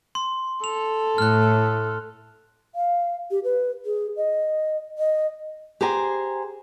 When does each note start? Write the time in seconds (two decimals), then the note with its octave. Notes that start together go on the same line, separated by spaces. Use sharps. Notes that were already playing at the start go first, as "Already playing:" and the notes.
0.15 C6
0.64 A4 F7
1.18 A2 F6 F#6
2.75 F5
3.31 G4
3.44 B4
3.85 G#4
4.17 D#5
4.98 D#5
5.81 G4 G#4 C5 G#5 A#5